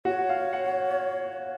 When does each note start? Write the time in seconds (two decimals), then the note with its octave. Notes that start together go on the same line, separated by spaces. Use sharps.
0.05 F#4 C#5
0.29 F5
0.53 F#5